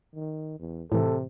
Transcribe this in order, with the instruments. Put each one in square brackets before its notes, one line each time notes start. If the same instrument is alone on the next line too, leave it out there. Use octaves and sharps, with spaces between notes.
[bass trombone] D#3
E2
[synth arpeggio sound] A2 E3 [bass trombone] C3 [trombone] A4